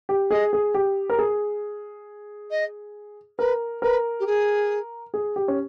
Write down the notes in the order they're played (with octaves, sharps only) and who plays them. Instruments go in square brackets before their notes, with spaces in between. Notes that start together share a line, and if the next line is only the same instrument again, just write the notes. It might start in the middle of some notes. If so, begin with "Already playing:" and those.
[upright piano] G4
[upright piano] G#4 [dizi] D#5
[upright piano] G#4
G4
A#4
G#4
[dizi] D#5
[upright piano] A#4 [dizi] B4
[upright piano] A#4 [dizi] B4
[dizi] G4
G#4
[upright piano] G#4
G4
C#4